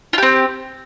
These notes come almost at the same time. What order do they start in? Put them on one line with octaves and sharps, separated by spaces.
F4 G4 C4